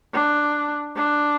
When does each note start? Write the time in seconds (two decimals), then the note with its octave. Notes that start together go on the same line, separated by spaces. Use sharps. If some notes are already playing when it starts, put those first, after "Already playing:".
0.13 D4
0.96 D4